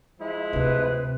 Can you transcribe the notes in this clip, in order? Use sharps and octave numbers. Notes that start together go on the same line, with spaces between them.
F3 G#3 E4
D2 C3 D4 B4